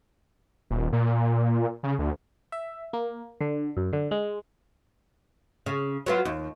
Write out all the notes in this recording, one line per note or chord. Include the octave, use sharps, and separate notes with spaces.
D#1
A#2
C#3
D2
E5
A#3
D3
F#2
D3
G#3
C#3
F#3 B3 F4
D#2